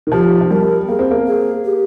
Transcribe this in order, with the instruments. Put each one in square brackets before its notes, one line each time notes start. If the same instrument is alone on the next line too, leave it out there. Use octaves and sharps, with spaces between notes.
[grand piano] D#3
[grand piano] F3 [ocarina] G4
[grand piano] F3
[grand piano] G3 [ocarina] A#4
[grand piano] A#3 [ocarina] G#4
[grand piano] C4
A#3
[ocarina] G#4
G4